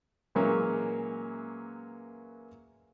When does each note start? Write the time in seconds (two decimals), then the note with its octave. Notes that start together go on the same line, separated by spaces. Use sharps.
0.35 A#2 E3 F#3 G#3 A#3 C#4